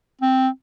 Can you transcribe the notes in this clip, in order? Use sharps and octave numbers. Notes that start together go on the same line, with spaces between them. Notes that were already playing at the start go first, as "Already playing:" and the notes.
C4